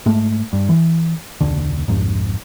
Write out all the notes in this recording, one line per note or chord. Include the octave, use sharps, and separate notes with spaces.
G#2 G#3 A3
G2
E3
E1 C#2 D3
C2 F2 G#2